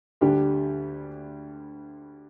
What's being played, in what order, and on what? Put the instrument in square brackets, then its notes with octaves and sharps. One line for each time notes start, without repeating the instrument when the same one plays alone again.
[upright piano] D2 D3 G3 D4 G4